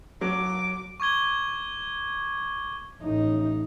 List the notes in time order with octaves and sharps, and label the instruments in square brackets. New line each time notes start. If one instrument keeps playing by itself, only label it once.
[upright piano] F#3 [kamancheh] D6
[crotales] C#6 D6 G#6 G7
[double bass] A1 D#4